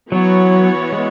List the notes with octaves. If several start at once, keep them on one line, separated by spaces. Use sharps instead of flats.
E3 F#3 B3 F#4 C#5
G#3